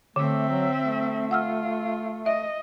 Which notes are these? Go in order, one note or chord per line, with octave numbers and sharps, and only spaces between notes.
D3 A3 C4 E5
F#3
A3
F4 F#5 E6 F6
D#5 E5